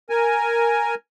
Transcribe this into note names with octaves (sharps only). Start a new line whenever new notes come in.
A#4 G#5